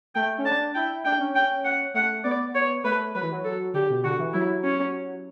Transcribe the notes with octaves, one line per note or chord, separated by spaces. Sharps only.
A3 G5
C#4
D4 A5
E4 G5
D4 G5
C#4
G5
F#5
A3 F#5
B3 D5
C#5
A3 B4
F#3 B4
E3
F#3
A4
D3 G4
B2
D3 F#4
E3
F#3 E4
C#4